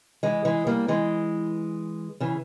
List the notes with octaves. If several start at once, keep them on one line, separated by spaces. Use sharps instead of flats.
E3 G#3
E3 G#3
G3 A#3
E3 G#3
C#3 E3